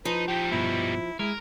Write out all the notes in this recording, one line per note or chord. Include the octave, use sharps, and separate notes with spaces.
F3 D#4 B4
G3 D#4 G5
G2 B2 E4
G#3 E4 A#4